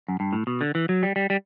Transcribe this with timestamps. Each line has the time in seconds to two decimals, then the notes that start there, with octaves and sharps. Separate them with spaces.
0.08 F#2
0.20 G2
0.33 A2
0.47 B2
0.61 D3
0.75 E3
0.89 F#3
1.03 G3
1.16 G3
1.30 G3